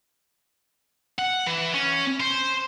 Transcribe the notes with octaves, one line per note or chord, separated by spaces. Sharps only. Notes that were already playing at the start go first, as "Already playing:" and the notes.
F#5
E3
C#4
C5